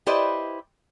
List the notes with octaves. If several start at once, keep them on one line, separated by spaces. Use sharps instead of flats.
E4 G4 B4 C5 D5 D#5